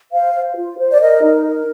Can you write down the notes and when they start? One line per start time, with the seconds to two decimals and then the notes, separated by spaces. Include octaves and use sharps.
0.11 C5 F5
0.34 C5
0.56 F4
0.78 C5
0.91 D5
1.00 A#4 D#5
1.22 D#4
1.44 A#4